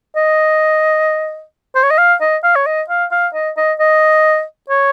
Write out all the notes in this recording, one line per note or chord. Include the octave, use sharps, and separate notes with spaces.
D#5
C5
C#5
D#5
F5
D#5
F5
C#5
D#5
F5
F5
D#5
D#5
D#5
C#5